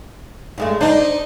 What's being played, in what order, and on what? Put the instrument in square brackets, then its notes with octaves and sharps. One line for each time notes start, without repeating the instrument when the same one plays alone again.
[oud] G2 G#3 A3
[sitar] D4 D#4 [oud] C5 D#5